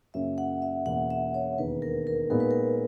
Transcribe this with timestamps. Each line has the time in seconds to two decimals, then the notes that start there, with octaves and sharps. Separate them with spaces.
0.14 F#2 C#3 F#3 A#3 C#4 E5
0.38 F#5
0.62 E5
0.86 E1 E2 B2 A#3 C#4 F#5
1.10 E5
1.34 C#5
1.58 E1 D#2 D#3 B4
1.82 A#4
2.07 A#4
2.30 A#2 G#3 B3 D#4 A#4
2.40 B4
2.51 A#4